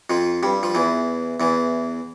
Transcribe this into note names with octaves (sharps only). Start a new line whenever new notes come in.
F2 F3
G2 G3
F3
E2 E3
E2 E3